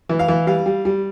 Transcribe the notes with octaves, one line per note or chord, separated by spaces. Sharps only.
E3
F5
E3
G3 F5
G3
G3